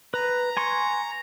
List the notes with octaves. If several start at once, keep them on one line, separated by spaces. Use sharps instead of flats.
B4 A#5
G#5 C6 C#6